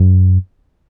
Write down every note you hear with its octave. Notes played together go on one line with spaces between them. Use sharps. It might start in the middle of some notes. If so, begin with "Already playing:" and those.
Already playing: F#2